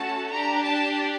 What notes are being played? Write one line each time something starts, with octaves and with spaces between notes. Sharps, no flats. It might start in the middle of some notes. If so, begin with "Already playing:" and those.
Already playing: A3 C#4 F#4 A4 A5
D4 G4 A#5
A5